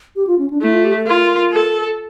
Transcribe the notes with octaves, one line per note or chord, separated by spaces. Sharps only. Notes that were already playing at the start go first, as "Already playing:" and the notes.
G4
F4
C#4
D4
A3 E4
F4
G4
A4
F4 A#4
A4